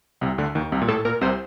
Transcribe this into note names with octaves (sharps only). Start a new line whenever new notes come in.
C2 C3
D2 D3
D#2 D#3
C2 C3
A#2
A2 A4
A#2 A#4
C2 C3 C5